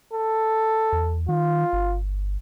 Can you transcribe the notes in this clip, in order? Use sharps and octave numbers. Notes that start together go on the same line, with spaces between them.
A4
E2
D#3 F4
G1